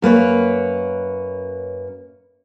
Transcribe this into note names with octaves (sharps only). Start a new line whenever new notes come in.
F#2 A#3 B4 C#5